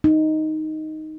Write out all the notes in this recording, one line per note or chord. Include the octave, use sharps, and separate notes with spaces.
D#4